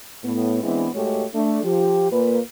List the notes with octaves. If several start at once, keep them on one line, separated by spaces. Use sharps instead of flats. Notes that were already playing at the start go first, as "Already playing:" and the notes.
A2 B3
E3 G#3 B3 C4 D4 E4
G#2 G#3 A3 F#4 G4 C#5
A3 D4
F3 G4
A#2 A#3 B4